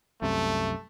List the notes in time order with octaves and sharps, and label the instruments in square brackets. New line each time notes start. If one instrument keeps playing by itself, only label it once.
[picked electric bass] C2 F#2 C3 [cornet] A3